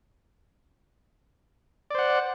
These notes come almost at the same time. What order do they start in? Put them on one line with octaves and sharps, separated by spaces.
D5 C5 F#5